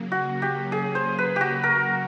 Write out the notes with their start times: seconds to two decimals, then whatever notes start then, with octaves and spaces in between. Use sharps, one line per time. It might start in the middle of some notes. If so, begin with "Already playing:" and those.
Already playing: C#3 F#3 A#3
0.12 F#4
0.42 G4
0.72 G#4
0.95 C5
1.18 B4
1.36 F#4 G4
1.63 A#4